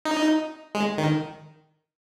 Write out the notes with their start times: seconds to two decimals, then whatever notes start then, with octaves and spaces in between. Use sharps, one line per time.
0.05 D#4
0.75 G#3
0.98 D#3